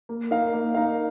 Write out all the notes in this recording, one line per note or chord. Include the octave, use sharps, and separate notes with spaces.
A#3
D#4 A#4 F5
A#3
D#4 A#4 F5